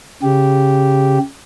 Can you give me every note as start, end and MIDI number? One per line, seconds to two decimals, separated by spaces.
0.23 1.19 49
0.23 1.19 67